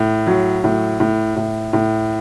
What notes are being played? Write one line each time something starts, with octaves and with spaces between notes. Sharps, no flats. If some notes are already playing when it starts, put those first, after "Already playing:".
Already playing: A2
F#3
A2
A2
A2
A2